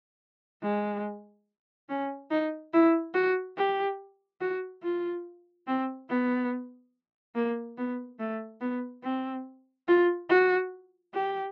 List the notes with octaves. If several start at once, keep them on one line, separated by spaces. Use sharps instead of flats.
G#3
C#4
D#4
E4
F#4
G4
F#4
F4
C4
B3
A#3
B3
A3
B3
C4
F4
F#4
G4